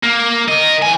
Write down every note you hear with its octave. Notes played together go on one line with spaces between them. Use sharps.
A#3
A#4 D#5
E2 G#5